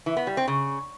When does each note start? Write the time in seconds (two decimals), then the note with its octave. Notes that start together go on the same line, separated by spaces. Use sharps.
0.06 E3
0.17 B3
0.27 G3
0.37 C4
0.48 C#3